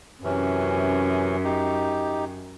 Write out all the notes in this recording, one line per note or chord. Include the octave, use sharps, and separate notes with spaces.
F#2 C3 E3 C#4
D#4 G4